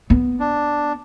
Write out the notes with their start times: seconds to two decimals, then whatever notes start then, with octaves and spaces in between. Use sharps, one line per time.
0.10 B3
0.40 D4